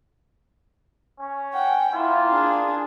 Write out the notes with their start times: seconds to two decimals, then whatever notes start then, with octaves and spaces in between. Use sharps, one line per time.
1.20 C#4
1.53 F#5 G5
1.94 A#3 E4 F4
2.30 D4 G#4